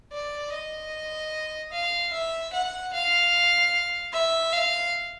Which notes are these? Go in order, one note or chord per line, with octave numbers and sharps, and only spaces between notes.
D5
D#5
F5
E5
F#5
F5
E5
F5